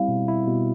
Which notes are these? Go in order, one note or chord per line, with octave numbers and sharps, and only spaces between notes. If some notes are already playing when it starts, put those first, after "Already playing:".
Already playing: G3 C4 E4 F5
B2
E4
B2